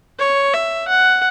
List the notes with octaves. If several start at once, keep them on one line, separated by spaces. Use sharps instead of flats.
C#5
E5
F#5